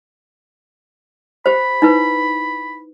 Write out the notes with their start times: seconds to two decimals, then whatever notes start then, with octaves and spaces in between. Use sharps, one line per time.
1.46 G4 C5 B5
1.82 D#4 E4 B4